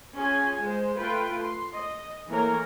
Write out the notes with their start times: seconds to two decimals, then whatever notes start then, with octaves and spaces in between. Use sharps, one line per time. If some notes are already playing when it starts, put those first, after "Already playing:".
0.16 C#4 F4 G#4 G#5
0.60 G#3 C5
0.97 A3 F4 B4 G5
1.43 C6
1.74 D#5
2.29 E3 A3 A#3 A#4 C#5 A#5